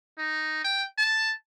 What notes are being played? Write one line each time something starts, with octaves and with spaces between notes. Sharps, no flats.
D#4
G5
A5